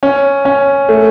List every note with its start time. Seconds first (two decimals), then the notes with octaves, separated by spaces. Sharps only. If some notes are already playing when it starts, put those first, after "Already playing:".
0.03 C#4
0.45 C#4
0.89 A3